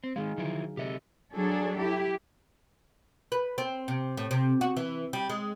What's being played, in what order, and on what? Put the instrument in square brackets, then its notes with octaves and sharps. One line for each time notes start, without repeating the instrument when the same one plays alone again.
[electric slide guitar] C4
[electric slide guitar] D#3 G#3 [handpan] D#4 G#4 F5
[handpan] D3 F#3 [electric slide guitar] D#3 F3 E4
[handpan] C3 E5 [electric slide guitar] G4 A4 D#5
[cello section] F#3 D4 G#4 A4
E4 G4
[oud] B4
C4
C3
A2
C3
F#4
E3
G3
G#3